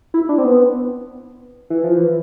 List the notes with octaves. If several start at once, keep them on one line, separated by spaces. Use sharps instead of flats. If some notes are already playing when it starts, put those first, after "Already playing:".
E4
D4
C4
B3
E3
F3
E3